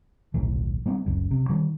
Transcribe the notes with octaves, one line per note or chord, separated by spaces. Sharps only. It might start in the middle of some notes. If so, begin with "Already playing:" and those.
D#1 B1 A2 E3
G3 G#3 B3 C4
F#1 C#2 F#2
C3
D#3 G3